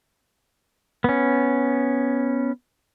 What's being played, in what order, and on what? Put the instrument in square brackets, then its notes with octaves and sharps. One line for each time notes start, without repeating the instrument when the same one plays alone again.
[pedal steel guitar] B3 C#4